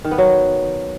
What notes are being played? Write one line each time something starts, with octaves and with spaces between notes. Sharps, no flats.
D#3
B3
F#3